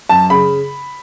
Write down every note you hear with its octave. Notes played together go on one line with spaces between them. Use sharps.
F#2 A5
C#3 B5